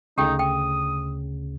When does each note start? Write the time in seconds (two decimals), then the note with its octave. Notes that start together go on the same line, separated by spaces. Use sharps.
0.18 D2 C#3 D#4 G4 A4 G5
0.39 G5 D#6